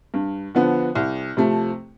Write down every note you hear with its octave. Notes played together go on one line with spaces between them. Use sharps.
G2
D3 F3 B3
C2
C3 F3 A3